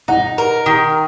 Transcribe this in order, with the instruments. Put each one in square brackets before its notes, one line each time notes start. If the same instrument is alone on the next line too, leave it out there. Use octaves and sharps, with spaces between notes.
[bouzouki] D#4 [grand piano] F#5
[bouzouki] A#4
D#3